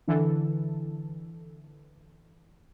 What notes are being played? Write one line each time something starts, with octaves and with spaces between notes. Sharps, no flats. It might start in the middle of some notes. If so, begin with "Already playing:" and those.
D3 E3 A4